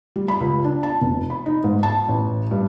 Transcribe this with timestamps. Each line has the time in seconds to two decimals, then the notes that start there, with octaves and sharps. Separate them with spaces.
0.16 G3
0.28 B5
0.40 C#2
0.65 D4
0.83 A5
1.01 F1
1.30 B5
1.46 D#4
1.64 G#2
1.83 A5
2.09 A1
2.51 G2